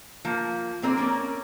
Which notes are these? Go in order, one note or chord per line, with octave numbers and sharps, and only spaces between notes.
F3 A#3
A#3 C4 A#4 D5
A#3 C#4 A#4 D5